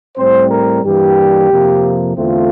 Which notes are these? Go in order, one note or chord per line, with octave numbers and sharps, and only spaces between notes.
A2 G3 C4 C5
A#4
G2 E3 G3 A#3 G4
F2 C3 F3 A#3
E2 D3 A3 C4 F4